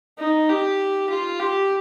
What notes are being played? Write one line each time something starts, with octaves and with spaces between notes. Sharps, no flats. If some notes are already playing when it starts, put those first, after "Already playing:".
D#4
G4
F4
G4